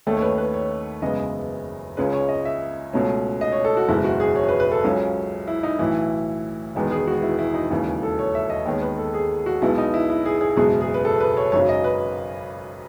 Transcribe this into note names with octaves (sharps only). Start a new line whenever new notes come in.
D#2 D#3 A3 C#4 A4
C#5
B4
B4
C#5
F#1 E2 C#3 G#3 B3 D#5
C#2 C#3 G#3 C#4 B4
C#5
D#5
E5
C#2 B2 A3 C#4
D#5
C#5
A4
F#4
F#1 E2 B2 G#3 E4
F#4
G#4
C#5
B4
B4
A4
C#2 C#3 F#3 C#4
E4
D#4
B1 A2 E3 E4
E1 E2 D#3 G#3 B3
G#4
F#4
E4
E4
D#4
E1 D#2 C#3 E3 E4
A4
C#5
E5
D#5
D#2 D#3 G#3 B3 C#5
B4
A4
G#4
F#4
B1 B2 G#3 B3 E4
D#4
E4
E4
G#4
G#4
F#1 E2 B2 G#3 G#4
G#4
B4
A4
B4
C#5
G#1 F#2 C#3 F#3 C#5
D#5
B4